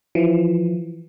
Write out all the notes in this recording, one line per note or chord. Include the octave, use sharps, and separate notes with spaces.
E3 F3